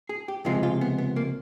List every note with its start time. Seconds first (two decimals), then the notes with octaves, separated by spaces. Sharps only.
0.09 G#4
0.28 G4
0.45 C#2 C3 F3 G#3 F4
0.63 F4
0.81 B3
0.98 B3
1.16 A#3